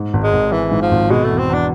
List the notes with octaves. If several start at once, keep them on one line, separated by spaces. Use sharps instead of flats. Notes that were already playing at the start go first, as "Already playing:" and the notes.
Already playing: G#2
G#1
G#3
G#1
E3 G#3
G#2
F3
G#1
B2 G#3
A3
E2
C4
E2 D4